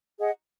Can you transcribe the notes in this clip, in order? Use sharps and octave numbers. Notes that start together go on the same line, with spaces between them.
G#4 D#5 F#5